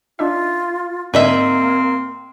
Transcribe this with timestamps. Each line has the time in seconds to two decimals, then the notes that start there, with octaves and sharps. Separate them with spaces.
0.19 D4 D#4 F4 E5
1.14 G#2 D3 A#3 C4 D#4 G#4 D#5 E5